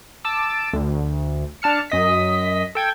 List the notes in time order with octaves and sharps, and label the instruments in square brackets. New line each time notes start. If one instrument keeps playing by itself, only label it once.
[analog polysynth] A5 D6 E6
D2
D4 A5 F6 C#7
F#2 D#5 B6
A4 G5 G#6